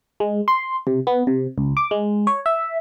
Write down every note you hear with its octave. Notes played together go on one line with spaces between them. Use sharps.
G#3
C6
C3
B3
C3
C#2
D6
G#3
C#5
E5